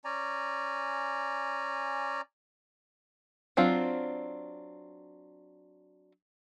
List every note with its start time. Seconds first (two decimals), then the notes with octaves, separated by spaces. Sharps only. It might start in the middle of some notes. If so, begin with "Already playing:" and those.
0.05 C#4 D5 G#5 A#5
3.57 F#3 C4 D4 F4